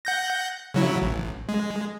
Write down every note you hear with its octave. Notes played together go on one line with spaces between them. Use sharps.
F#5 G6 A#6
C#3 F#3 E4
A1
G#3